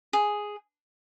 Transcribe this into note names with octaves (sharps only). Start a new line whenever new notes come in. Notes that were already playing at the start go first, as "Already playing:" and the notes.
G#4